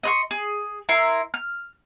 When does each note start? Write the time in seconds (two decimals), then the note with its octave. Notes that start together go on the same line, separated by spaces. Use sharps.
0.03 D#5 C6 C#6
0.31 G#4
0.89 E4 A#4 C6
1.34 F6